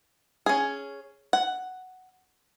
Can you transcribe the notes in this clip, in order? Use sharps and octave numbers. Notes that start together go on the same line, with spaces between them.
C#4 G#4
F#5